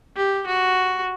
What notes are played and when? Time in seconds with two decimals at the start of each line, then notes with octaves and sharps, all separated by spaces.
0.16 G4
0.47 F#4